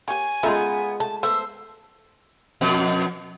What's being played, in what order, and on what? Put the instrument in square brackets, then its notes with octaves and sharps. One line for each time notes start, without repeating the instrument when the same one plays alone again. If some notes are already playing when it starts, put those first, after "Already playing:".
[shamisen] A#3 G4 [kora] C#5 [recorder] G#5
[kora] G#3 D#4 F4 [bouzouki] B3 [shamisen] C#4 A4 E5
[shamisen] A3 [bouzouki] A5
[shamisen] A3 B3 [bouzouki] C5 [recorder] E6
[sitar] F2 B2